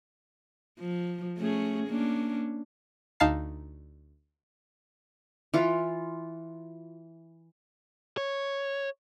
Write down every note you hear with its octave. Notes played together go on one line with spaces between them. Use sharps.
F3
A3 C#4 G#4
A#3 C#4 D4
D2 D#4 F5 A5 C7
E3 F4
C#5